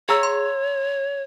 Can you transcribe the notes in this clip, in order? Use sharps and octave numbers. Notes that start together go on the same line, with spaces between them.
G#4 C#5 F5 A#5 E6
C6